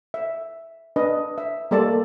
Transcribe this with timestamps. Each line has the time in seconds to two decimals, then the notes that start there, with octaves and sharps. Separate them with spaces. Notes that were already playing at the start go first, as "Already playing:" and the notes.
0.14 E5
0.96 D4 B4 D#5
1.38 E5
1.71 G3 A#3 A4 D5 A5